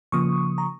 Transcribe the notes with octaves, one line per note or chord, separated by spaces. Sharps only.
C#3 F3 A#3 C#6 D#6
A#5